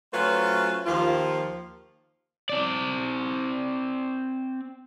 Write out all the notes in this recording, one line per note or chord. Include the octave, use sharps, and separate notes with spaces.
F#3 A3 C#4 F4 B4 C5
D#2 F3 F4
C4 D5